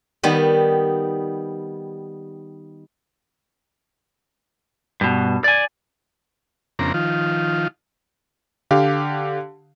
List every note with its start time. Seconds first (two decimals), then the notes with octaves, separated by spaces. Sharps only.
0.23 D#3 G3 B3
5.01 G2 B2
5.44 D5 G#5
6.79 F2 C#3 A#3 C4 D4 A#5
6.94 D#3 F3 F4
8.71 D3 G4 F5